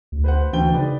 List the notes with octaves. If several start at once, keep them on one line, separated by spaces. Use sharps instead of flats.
D2
B4 C5 F#5
D2 E3 G5 G7
C#3 D#4 B4 D5